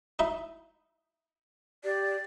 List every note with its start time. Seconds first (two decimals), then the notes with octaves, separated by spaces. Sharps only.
0.19 D#4 E4 E5
1.84 G4 D5